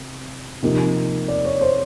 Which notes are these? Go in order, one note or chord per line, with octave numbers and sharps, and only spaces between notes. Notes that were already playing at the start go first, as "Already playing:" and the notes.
Already playing: C3
C3 F3 A#3 D#4
D5
C#5
C5